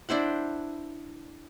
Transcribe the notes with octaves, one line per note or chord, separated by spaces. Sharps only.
D4 E4 C5 F#5